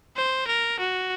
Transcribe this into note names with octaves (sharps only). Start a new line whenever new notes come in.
C5
A#4
F#4